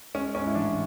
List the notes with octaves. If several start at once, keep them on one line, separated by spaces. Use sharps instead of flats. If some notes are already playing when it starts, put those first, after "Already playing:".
G#3 C#4
G#2 C#4
E4
A1 D4